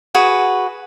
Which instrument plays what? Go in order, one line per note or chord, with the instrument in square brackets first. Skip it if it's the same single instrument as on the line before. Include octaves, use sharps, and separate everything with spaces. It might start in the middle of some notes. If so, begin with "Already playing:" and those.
[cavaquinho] F#4 G#4 B4